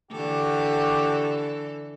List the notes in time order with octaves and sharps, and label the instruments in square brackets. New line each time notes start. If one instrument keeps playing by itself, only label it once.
[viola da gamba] D3 E3 A4 [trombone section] F#4 G4